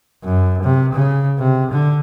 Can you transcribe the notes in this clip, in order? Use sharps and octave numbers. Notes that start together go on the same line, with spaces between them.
F#2
C3
C#3
C3
D3